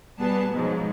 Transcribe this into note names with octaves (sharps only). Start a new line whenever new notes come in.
B2 G3 B3 G#4 A5
G#2 B2 F3 F#3